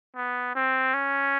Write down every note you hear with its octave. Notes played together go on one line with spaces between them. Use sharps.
B3
C4
C#4